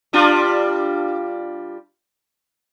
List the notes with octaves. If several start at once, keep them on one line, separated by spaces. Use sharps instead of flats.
G3 D4 F4